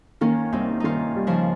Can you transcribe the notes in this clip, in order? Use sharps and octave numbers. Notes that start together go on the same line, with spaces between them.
D#3 A#3 C#4
C2 C4 D#4
D#3 C#4 D#4 F4
G3
C#3 F3